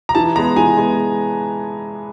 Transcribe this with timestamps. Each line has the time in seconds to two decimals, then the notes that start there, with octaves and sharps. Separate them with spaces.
0.09 A#5
0.15 E3 A5
0.36 G#3 B3 A#5
0.56 E3 G#5
0.77 G#3 B3